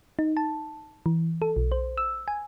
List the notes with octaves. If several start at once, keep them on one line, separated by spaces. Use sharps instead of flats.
D#4
A5
E3
A4
B1
C5
E6
G#5